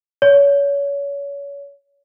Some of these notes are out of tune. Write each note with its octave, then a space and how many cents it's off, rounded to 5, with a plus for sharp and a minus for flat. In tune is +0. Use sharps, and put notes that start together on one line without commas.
C#5 +30